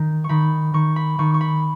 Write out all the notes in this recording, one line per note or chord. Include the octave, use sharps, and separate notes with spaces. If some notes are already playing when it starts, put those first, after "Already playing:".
Already playing: D#3
C#6
D#3 B5
D#3 C#6
B5
D#3 C#6
C#6
B5